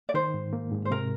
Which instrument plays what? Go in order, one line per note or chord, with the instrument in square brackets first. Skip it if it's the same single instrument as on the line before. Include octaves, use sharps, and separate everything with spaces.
[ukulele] D5
[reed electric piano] D#3 [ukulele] C5
[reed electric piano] G#2
A#3
G#2
[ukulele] C5
[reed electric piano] C3 [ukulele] A#4